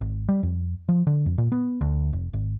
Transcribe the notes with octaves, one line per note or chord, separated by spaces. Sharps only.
G#1
G3
F2
F3
D3
F2
A#2
B3
D2
F1
G#1